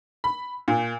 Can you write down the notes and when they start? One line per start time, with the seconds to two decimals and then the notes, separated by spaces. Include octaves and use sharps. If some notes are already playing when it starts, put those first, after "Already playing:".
0.24 B5
0.68 A#2